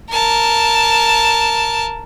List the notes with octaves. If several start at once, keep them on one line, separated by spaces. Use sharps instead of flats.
A#4 A5